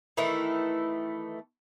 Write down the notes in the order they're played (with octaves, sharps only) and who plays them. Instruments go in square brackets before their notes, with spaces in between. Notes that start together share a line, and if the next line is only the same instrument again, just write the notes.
[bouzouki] D#3 E3 A3 E4